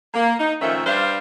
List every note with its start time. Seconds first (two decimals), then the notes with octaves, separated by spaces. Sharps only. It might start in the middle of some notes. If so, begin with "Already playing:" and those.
0.13 A#3
0.39 D#4
0.60 A#2 D#3 F3 A3 C#4 E5
0.85 G3 D4 B4 C5 F5